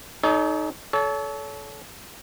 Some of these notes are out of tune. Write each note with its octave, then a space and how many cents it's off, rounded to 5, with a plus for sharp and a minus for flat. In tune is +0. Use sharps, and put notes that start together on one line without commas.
D#4 +0 A4 -40 C#5 +45
A4 -25 C#5 +35